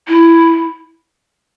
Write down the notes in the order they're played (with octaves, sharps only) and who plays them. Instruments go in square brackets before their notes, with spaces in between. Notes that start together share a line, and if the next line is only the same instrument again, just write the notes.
[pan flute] E4